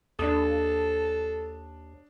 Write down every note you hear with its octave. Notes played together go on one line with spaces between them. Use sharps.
D#2 D4 A4 D#6